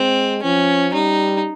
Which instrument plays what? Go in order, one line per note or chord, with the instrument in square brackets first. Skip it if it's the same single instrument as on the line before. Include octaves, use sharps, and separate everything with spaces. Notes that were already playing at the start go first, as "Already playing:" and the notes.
Already playing: [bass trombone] G#3 [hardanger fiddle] C4
[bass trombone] F3 [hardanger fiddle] C#4
[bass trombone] G3 [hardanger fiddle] D#4